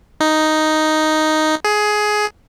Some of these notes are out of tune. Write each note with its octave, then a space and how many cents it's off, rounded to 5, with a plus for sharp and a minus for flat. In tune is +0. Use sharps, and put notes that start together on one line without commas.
D#4 +0
G#4 +15